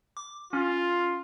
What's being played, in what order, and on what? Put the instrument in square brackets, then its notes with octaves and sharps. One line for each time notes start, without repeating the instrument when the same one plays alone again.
[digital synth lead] D6
[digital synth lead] C#4 [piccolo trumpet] F4